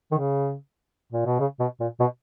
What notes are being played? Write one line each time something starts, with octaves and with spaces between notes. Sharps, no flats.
D#3
C#3
A#2
B2
C#3
B2
A#2
B2